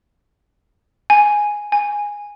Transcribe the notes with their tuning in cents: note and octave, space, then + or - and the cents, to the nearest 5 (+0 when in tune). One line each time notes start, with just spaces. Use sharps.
G#5 +0
G#5 -10